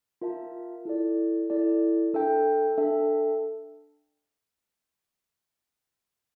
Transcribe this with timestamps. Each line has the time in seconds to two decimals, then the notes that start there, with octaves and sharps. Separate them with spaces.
0.21 F4 A#4 E5 A5
0.85 E4 A4 D5
1.50 E4 A4 D5
2.14 D4 A4 E5 G5
2.78 D4 A4 E5 G5